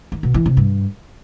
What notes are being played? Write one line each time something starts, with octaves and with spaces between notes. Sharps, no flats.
D#3
B2
E3
C3
G2